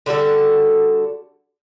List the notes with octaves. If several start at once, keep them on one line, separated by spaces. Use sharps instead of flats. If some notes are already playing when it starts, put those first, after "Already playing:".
D3 G3 F#4 A4